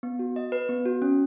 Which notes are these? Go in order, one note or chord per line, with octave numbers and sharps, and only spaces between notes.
B3
F#4
D#5
B4
B3
F#4
C#4